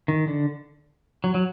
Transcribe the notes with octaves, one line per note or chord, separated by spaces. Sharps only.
D#3
D3
F#3
F#3